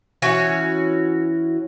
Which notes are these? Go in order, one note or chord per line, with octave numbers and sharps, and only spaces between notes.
E3 C#4 F#4 C#5